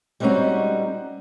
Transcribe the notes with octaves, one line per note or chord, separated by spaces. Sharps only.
G3 G#3 C4 C#4 D#4 F#4